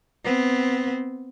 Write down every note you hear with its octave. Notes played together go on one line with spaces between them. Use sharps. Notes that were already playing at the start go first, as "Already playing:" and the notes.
B3 C4